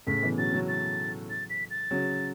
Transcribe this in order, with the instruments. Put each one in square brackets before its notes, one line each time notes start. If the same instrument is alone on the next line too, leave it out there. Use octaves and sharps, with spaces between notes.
[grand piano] A2 C#3 [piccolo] B6
[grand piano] B2 E3
[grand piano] C#3 F#3 [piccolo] A6
[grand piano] C#3 F#3
[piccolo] A6
A6
B6
A6
[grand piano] C#3 F#3